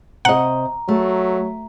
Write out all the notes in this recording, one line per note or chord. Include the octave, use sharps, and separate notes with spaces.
C3 D#5 F#5 A#5
F#3 A3